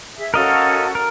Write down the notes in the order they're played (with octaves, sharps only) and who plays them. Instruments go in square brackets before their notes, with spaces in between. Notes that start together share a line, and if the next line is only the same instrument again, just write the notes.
[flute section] G#4 E5
[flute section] C#4 F#4 A4 [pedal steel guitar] A#4 D#5 F5
[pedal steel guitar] A#4